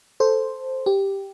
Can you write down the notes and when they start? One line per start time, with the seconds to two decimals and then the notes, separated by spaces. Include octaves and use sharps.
0.20 A4 C5
0.86 G4